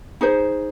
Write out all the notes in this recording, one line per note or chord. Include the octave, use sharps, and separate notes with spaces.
D#4 G#4 C5